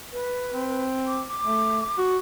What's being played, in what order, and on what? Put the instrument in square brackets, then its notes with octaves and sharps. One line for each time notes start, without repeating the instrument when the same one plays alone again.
[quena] B4
[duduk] C4
[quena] D6
D6
[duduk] A3
F#4